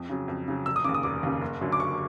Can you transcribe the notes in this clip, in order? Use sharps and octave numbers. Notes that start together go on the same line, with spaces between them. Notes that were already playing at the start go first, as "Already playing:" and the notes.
Already playing: F2
C#3 F#3
F2
C#3 F#3
F1 E6
D#6
D#2 C#3 D6
D#6
F1 D6
D#2 C#3
F#1
F#2 D3 F#3
D6
F#1 C#6